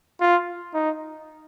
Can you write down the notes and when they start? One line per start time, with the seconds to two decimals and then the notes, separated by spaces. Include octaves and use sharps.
0.21 F4
0.74 D#4